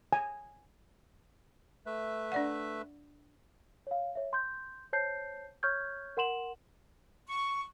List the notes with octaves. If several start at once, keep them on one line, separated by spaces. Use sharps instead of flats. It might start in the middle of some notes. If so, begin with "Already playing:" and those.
G#5
A3 B4 E5
D4 D5 F#5
C#5 F5
C#5 E5
C6 G6
C5 C#5 A5 G6 C7
C#5 C#6 F6 G6 G#6
A#4 F#5 C6 E7 F#7
C#6